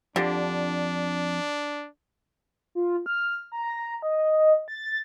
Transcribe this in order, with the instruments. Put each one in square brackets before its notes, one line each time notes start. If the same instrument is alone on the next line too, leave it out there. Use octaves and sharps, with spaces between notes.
[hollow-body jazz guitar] F2 G4 [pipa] D3 [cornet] D4
[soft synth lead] F4
F6
A#5
D#5
A6